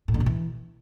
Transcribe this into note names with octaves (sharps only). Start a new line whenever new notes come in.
A2
D3
B2
E3